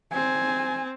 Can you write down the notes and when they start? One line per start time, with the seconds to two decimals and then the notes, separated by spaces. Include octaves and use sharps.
0.12 C4 G#5